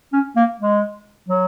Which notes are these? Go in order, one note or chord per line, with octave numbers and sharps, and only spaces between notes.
C#4
A#3
G#3
F#3